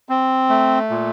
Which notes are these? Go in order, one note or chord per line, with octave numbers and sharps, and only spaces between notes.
C4
A3
A#2